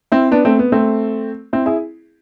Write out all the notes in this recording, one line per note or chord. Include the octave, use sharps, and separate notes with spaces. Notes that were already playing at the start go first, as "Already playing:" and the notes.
C4 E4
B3 D4
A3 C4
B3
A3 C4
C4 E4
E4 G#4